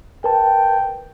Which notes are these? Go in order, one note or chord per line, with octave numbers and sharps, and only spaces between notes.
A#4 B4 G5 A5